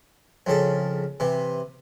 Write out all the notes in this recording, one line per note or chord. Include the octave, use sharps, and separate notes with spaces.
F2 C#3 A4
C3 E3